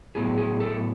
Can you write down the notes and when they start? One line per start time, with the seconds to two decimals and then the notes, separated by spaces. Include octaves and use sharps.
0.15 A2 F#3 B3 G#4
0.38 G#4
0.60 A4